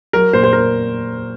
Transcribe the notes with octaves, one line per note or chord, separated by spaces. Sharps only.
F#3 A#4
A#2 C5
C5
A#2 A#4